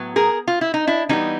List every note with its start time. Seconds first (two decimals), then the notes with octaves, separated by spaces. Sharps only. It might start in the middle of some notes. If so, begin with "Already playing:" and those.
Already playing: A2 F#3 B3
0.16 G#4 A#4
0.48 F4
0.61 E4
0.74 D#4
0.87 D4 E4
1.09 E3 G3 B3 C#4 D#4